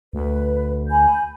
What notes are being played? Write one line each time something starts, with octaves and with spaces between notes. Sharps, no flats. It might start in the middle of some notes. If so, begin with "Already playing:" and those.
D2 B4
G#5 B5 G6